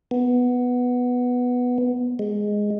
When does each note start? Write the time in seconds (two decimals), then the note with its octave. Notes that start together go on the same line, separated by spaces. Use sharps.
0.11 B3
2.19 G#3